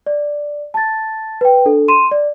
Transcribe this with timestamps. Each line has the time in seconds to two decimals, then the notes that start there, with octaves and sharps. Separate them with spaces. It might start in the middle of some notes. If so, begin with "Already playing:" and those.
0.06 D5
0.74 A5 A6
1.41 B4 G5
1.65 D4 A4
1.88 C6 D#7 E7
2.11 D5